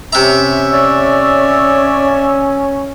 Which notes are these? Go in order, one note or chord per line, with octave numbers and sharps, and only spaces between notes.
C3 C#4 E5 A#5
C#5 D5